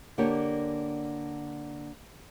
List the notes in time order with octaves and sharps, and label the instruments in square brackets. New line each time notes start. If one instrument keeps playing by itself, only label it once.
[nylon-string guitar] D3 A#3 D4 G4 C#5